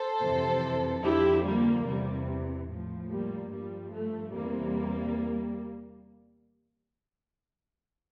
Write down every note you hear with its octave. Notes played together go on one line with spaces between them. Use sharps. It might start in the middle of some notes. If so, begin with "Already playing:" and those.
Already playing: A4 C5
F2 C3 E3
F2 D3 F3 E4 G4
G3 A#3
E2 C3 E3 G3
A2 F3
G3 A#3
G2 F3 G3
A3
E2 C3 E3 G3 A#3